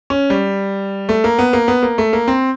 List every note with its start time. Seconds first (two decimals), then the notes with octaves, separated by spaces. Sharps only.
0.10 C#4
0.30 G3
1.09 A3
1.24 A#3
1.38 B3
1.53 A#3
1.68 B3
1.83 A#3
1.98 A3
2.13 A#3
2.28 C4